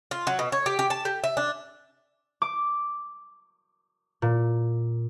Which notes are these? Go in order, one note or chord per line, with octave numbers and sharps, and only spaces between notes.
F4
F#3
B2
C#5
G4
G4
A5
G4
E5
D4
D6
A#2